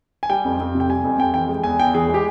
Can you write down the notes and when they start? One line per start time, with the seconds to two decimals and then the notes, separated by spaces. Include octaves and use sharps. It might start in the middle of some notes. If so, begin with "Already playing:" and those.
0.23 G#5
0.30 G3 G5
0.45 F2
0.60 F2
0.75 C3
0.80 G5
0.89 G3 G#5
1.04 F2
1.19 F2 G5
1.34 E3 G5
1.49 G#3
1.63 E2 G#5
1.80 E2 G5
1.94 E3 G#4
2.08 G#3
2.14 G4